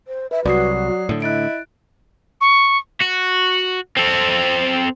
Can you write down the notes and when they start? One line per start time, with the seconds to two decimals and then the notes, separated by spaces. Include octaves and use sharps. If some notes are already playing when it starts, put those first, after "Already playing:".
0.08 C5
0.31 B4 E5
0.46 C2 F#3 F#4 D5 D#6 C7
1.09 A2 D3
1.22 E4 D#5 F#6 A6 D7
2.41 C#6
3.01 F#4
3.97 C4 A4